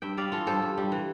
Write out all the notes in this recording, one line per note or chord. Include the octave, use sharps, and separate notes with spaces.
G2 E5 G5
G3 D5 F5
E3 F4 A4
G2 A4 C5
G2
G3
E3